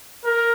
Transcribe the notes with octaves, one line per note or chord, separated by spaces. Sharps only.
A#4